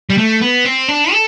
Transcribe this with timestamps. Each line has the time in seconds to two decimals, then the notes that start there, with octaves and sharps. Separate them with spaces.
0.10 G3
0.18 A3
0.41 B3
0.65 C4
0.89 D4
1.12 A4